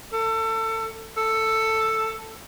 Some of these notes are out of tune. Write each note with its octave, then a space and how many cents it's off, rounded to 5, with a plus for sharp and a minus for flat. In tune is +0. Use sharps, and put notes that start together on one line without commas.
A4 +25
A4 +10